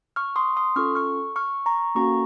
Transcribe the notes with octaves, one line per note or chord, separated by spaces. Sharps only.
C#6 F6
C6 D#6
C6 D#6
C#4 F4 A4 C#6 F6
C#6 F6
C#6 F6
A#5 C#6
A#3 C#4 F#4 A4 A#5 C#6